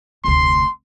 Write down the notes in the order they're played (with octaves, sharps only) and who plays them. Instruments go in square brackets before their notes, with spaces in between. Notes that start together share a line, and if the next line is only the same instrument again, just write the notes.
[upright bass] F1 D2 [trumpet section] C6